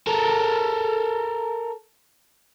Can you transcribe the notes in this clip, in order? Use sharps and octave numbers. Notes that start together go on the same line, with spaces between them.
A4 A#4